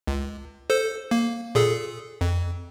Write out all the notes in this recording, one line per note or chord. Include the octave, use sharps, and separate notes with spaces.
C#2
A4 C5
A#3
A#2 G#4 A4
F2